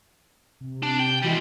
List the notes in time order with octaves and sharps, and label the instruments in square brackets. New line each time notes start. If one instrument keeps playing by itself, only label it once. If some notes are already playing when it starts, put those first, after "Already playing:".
[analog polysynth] C3
[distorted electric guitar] D4
G5
[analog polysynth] E3 E4 F#4 [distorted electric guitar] G3 G#3